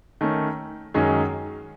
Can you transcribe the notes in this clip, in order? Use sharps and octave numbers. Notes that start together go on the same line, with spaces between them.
D#3 A3 C#4
F#2 D#3 G#3 C#4 G#4